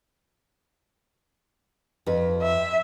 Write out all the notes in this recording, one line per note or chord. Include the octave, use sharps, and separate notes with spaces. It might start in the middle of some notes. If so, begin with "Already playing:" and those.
F2 B4
E5